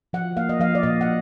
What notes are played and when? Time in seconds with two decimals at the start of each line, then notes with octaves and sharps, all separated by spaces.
0.13 F3 F#5
0.37 A#3 F5
0.49 D#5
0.60 F3 F5
0.75 D5
0.83 A#2 D#5
1.01 F#5